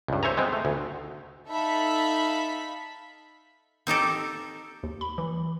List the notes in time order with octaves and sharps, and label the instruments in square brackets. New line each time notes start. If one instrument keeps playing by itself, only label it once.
[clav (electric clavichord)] C#2 G2
C5 C#5 E5 G#5 A#5
G#3 B3 C4
A3
D2
[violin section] D#4 A4 E5 F5 B5 B6
[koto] C4 D#4 G4 A4
[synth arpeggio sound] D#2
B5
E3